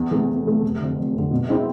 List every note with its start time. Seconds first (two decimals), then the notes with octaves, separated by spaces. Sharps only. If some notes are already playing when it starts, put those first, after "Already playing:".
Already playing: E2
0.11 C3 E3 A3
0.29 E2
0.46 C3 E3 A3
0.63 F1
0.79 F2 D3
0.96 F1
1.14 F2 D3
1.31 B2
1.49 G#3 C4 E4